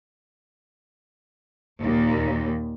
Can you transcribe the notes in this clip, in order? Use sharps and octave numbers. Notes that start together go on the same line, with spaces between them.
D#2 A#2